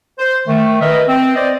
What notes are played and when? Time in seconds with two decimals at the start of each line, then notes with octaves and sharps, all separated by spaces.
0.19 C5
0.47 D#3 A3
0.81 A#4 B4 D#5 E5
1.08 C4
1.35 C5 D5 D#5